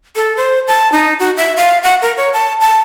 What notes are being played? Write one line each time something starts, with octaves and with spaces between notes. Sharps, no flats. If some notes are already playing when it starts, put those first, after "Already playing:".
A4
C5
A5
D#4
F#4
E5
F5
F#5
A#4
C#5
A5
A5